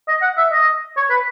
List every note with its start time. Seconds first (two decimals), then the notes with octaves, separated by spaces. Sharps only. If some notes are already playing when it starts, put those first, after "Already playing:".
0.08 D#5
0.22 F#5
0.37 E5
0.52 D#5
0.97 C#5
1.10 B4